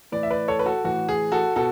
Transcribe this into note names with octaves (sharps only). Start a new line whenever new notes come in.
A2 E3 B4 D5
E5
B4 D5
A4 C#5
B4
F#4 A4
A2 E3 F#4
G#4
F#4 A4
B2 F#4 A4